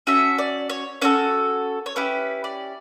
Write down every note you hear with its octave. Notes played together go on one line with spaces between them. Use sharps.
C#4 F#4 A4 E5
D5
C#5
C#4 F#4 A4 C#5
C#5
C#4 E4 G4 B4
D5